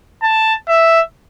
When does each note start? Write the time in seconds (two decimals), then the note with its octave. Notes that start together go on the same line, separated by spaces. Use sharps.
0.22 A5
0.68 E5